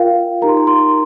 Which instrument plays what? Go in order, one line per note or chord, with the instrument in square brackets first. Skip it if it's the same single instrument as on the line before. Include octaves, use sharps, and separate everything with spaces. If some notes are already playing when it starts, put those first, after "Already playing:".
Already playing: [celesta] F4 A#4 F5 G5
D#4 G4 A#4 A#5
C6
A#5
C6